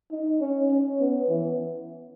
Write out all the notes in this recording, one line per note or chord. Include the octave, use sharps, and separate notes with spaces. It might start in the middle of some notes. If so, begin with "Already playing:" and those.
D#4
C#4
C#4
B3
E3